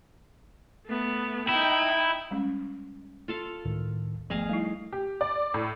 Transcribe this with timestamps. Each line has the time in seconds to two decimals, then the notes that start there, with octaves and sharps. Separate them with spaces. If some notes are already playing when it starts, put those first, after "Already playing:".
0.86 A3 B3
1.49 D#4 E4 G5
2.31 G3 G#3 C#4
3.28 F4 A4 F5
3.65 C#2 A2 D#3
4.30 G#1 F3 A3 B3 G#4 D#5 F5
4.49 G3 A3 D#4 E4 C7
4.92 G4
5.21 D5
5.54 A2